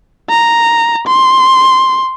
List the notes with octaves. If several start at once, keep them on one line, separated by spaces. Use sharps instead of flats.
A#5
C6